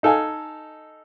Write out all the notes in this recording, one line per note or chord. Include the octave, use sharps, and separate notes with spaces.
D#4 A4 F5 G#5